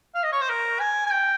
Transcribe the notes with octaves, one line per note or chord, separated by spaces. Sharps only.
F5
D#5
C#5
C5
A#4
G#5
G#5
G5